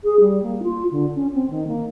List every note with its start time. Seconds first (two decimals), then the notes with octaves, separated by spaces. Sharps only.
0.04 G#4
0.20 G3
0.43 A#3
0.63 F4
0.91 D3
1.15 C#4
1.34 C4
1.50 D#3
1.67 A#3